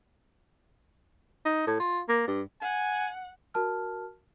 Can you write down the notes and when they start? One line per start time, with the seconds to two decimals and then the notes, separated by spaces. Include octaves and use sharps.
1.46 D#4
1.67 A2
1.80 F4
2.09 A#3
2.28 G2
2.62 F#5 G#5
3.54 F#4 A#4 A5 F6